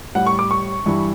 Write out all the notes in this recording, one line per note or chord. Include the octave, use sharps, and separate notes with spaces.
A2 G3 F#5
C#6
D6
C#6
G2 E3 G3